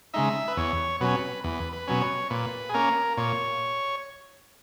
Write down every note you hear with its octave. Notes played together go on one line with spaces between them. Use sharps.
C#3 G#3 D#4 E5
B4
E2 C#5
B2 F#3 C#4 B4
E2 B4
B4
B2 F#3 C#4
C#5
A#2 B4
G#4
A#3 C#4 A#4
A#2 C#5